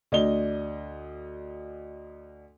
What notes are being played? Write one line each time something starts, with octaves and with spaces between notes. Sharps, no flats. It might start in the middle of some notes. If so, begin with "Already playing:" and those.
D2 D4 D#5 G7